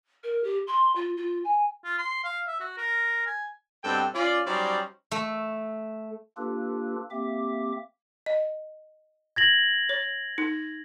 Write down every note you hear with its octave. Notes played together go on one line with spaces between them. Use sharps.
A#4
G4
C6
F4
F4
G#5
F4
C6
F5
E5
F#4
A#4
G#5
G2 B2 C4 A4 G5
C#4 F4 D5
F#3 G3 C#4 D#4 C5 D5
A3
A#3 D4 F4 G4 A4 B4
A#3 C4 G4 E5 D6
D#5
G#6 A#6 F#7
C#5
D#4